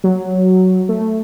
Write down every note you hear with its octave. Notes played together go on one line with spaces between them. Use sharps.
F#3
A3